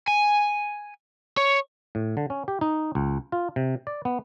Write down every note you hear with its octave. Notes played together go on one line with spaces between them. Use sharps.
G#5
C#5
A2
D3
C#4
G4
D#4
C#2
F4
C3
D5
B3